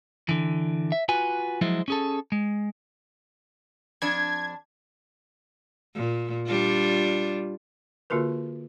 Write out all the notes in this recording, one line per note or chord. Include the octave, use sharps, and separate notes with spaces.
D3 E3
E5
F4 F#4 B4 G#5
F3 F#3 G#3 E4 C5
C#4 G#4 A4
G#3
F2 D4 G#6
A#2
G3 D4 F4
D3 A#3 F4 F#4 A#4 B4